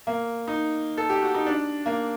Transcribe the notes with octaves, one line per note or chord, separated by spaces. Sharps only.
A#3
D#4
A4
G4
F#4
D#4
D4
A#3